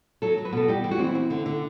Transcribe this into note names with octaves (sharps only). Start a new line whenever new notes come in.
F#3 A4
F#3
B4
B2 A4
G3 G4
E3
F#4
C4 E4
C4
D3
D3